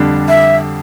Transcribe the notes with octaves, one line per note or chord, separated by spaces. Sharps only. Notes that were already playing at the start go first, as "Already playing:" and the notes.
Already playing: F2 D3 G3 D4
E5